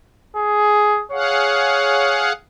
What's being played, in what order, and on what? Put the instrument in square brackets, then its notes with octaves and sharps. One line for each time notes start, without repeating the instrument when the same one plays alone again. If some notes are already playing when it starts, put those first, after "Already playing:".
[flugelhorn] G#4
[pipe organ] G#4 F5 F#5 [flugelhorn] C#5